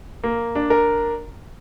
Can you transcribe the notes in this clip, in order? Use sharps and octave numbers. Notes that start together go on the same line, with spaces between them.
A#3
D4
A#4